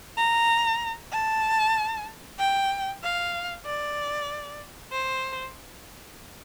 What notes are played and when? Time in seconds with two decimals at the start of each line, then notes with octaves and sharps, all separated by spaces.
0.17 A#5
1.12 A5
2.39 G5
3.03 F5
3.65 D5
4.92 C5